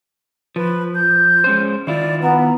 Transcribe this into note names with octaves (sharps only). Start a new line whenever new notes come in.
F3 B4
G6
G#3 C#4 C5
D#3 E4 F4 D5
B3 A#5